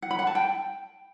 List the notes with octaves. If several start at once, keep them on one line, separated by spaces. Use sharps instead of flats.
F#5
B5
F#5
A5
G5